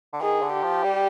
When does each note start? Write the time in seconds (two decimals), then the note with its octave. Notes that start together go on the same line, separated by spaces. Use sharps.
0.13 D3
0.21 D#3 G#4
0.42 D3
0.53 G4
0.63 F3
0.84 G3